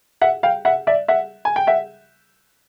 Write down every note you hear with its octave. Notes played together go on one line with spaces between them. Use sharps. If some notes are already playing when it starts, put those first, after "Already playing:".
E5 F#5
F5 G5
E5 F#5
D5 E5
E5 F#5
G#5
G5
E5 F#5